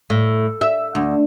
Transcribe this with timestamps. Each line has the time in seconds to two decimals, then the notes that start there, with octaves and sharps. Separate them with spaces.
0.10 A2
0.61 E5
0.95 D2